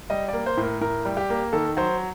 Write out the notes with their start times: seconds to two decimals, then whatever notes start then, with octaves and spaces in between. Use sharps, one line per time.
0.10 G3 D#5
0.28 A#3 D5
0.46 C5
0.57 A2
0.63 A#4
0.81 A2 A#4
1.05 G3
1.17 G4
1.30 A#3
1.53 D#3 A4
1.77 F#3 C5